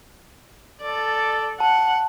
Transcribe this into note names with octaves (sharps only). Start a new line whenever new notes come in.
A4 D5
F#5 A5